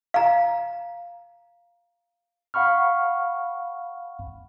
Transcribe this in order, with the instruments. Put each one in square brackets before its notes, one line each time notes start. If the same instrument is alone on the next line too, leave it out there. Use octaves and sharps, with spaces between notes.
[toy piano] F5 A#5
[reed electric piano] F5 F#5 B5 C#6 F6